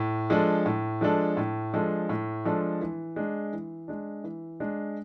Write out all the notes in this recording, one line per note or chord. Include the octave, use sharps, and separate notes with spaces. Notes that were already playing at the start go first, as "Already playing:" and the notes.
Already playing: A2
F3 G#3 D4 A4
A2
F3 G#3 D4 A4
A2
F3 G#3 D4 A4
A2
F3 G#3 D4 A4
E3
G#3 D4
E3
G#3 D4
E3
G#3 D4